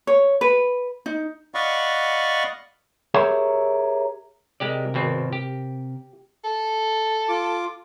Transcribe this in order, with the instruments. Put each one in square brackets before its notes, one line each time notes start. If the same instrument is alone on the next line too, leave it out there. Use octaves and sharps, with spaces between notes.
[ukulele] C#5
B4
D#4
[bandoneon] D5 D#5 F5 F#5 B5 C#6
[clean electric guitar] G4 G#4 A#4 C#5 E5
[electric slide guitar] C3 A#4 [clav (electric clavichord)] G#3 G4 D5
[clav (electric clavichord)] G#1 B2 C4
G4
[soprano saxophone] A4
[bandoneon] F4 D6